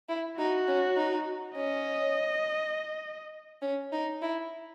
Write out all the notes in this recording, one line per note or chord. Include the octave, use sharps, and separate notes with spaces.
E4
D#4 F#4
C#4
D#4
C#4 D#5
C#4
D#4
E4